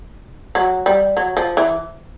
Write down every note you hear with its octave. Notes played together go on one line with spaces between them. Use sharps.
F#3
G3
F#3
F3
E3